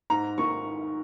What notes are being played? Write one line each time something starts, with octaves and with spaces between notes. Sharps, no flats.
G#2 A#5
D#3 C#6